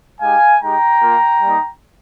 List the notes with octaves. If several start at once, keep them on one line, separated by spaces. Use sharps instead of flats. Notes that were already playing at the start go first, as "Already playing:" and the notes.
G#3 D#4 G4 F5 G#5
G#3 D#4 G4 G5 A#5
A#3 F4
G3 A#3 D#4